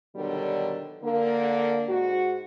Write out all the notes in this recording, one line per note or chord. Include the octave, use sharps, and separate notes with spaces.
B2 D3 D#3 F#3 G3
D3 A#3
G#2 F#4